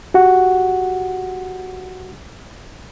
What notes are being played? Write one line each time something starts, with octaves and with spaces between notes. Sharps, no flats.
F#4 G4 F#5